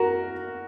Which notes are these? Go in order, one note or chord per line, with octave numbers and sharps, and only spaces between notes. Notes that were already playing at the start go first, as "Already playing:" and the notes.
Already playing: F#4 A#4